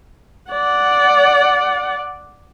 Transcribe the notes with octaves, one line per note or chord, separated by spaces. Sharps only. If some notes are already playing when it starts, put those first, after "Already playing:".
D5 F#5